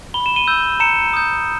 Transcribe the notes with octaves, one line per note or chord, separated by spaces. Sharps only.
B5 G7
E7
D#7 G7
E6 G6
A#5 C#7 E7
D#6 G6